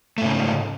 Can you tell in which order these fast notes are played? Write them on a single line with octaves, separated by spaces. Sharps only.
A3 G#2 C#3